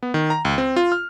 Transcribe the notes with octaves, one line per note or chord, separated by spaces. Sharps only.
B3
D#3
A#5
C#2
C4
F4
F6